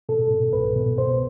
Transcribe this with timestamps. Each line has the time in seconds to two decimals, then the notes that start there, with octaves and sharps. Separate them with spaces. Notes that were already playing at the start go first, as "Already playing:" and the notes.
0.09 B2 A4
0.31 B2
0.53 C2 B4
0.76 B2
0.98 B2 C5